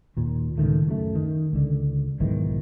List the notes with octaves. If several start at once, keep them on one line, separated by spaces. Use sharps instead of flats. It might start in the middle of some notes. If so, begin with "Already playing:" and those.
D#2 A#2
C#2 A2 D#3 A3
F#2 A3
D#3
C#2 D3
B1 G#2 D#3 E3